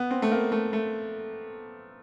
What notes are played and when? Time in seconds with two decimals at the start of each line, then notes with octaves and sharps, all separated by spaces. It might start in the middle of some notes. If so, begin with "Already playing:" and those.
Already playing: B3
0.11 C4
0.22 A3
0.32 A#3
0.52 A3
0.73 A3